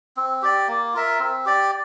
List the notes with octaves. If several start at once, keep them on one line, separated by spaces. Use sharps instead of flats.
C4
G4 D5
A#3
F4 A#4 E5
C4
G4 D5